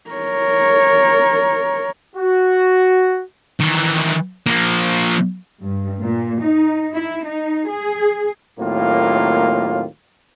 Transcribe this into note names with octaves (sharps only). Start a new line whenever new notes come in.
A#4 C#5
F#4
D#3 E3
F3 A#3
G2
A#2
D#4
E4
D#4
G#4
D#2 A2 F#3 A#3 C4 F4